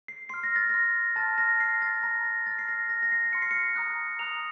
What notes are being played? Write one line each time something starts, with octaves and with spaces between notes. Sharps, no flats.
C7
C6 F6 C7
A#6
A6
C6 F6 A#6
A5 C6 F6 A6
A#6
A5 C6 F6 C7
A6
A#5 F6 A#6
A#6
A#5 F6 A6
C7
A#6
C6 F6 A#6
A#6
C7
C6 F6 C#7
C7
C#7
A#5 D#6 F#6
A#5 D#6 F#6 F7